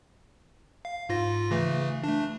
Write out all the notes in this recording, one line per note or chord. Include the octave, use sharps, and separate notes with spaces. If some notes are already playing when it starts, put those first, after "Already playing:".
F5
G#2 F4 A#6
C#3 E3 A3
A3 D4